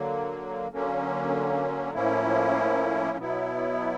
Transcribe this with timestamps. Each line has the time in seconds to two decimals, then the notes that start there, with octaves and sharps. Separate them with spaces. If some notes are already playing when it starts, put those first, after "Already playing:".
Already playing: D3 F#3 A#3
0.71 D3 F#3 A#3 C#4
1.94 A2 F3 A#3 C#4 E4
3.18 B2 F#3 B3 E4